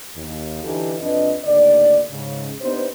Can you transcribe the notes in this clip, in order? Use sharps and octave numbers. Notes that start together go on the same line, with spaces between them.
D#2
D3 E3 D#4 E4 G4 A4
F2 C3 D4 B4 D#5
D#2 A2 D3 D5
G#2 C#3
B3 D4 D#4 G4 C5